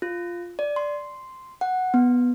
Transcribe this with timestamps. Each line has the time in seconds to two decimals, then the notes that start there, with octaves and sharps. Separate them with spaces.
0.02 F4
0.59 D5
0.76 C6
1.61 F#5
1.94 B3